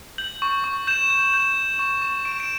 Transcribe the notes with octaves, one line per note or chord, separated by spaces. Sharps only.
G6 F#7
C#6
C#6
G6 E7
G6
G6
G6
C#6
C#6
C#6 D7
E7
D7